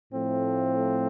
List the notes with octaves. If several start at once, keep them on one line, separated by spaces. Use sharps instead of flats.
A2 F3 A3 C4